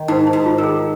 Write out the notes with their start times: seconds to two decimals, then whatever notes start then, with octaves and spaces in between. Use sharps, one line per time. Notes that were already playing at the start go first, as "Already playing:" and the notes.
Already playing: D#3
0.08 G#2 D#4
0.27 D#4
0.33 G#2
0.46 F4
0.58 D#3 A#4
0.64 G#4